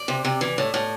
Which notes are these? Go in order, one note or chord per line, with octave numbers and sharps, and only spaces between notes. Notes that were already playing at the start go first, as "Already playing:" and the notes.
Already playing: D5
C3
C3
E3
A2
A2